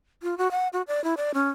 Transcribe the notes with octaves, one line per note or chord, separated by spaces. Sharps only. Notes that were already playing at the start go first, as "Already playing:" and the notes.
F4
F#4
F#5
F#4
D5
E4
D5
C#4